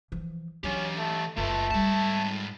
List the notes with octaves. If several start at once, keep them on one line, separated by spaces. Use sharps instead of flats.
E3 F3
E3 F#3 C#4 D4 G4
A3
F#1 A3 F4 B4
G#2 G3 C#4 A5